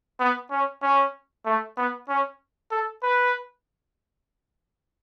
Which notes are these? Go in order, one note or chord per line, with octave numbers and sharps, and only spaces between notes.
B3
C#4
C#4
A3
B3
C#4
A4
B4